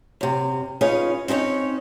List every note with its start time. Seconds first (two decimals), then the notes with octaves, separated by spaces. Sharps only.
0.21 F#2 C3
0.81 C#4 D#4 F4 G#4 B4 C#5
1.28 C4 C#4 D#4 C#5